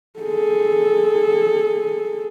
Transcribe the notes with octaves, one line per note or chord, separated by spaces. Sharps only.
G#4 A4